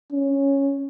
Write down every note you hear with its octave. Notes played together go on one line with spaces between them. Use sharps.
C#4